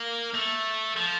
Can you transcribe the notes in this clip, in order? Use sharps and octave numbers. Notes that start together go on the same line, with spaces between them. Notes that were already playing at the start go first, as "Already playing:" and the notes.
Already playing: A#3
A3
F3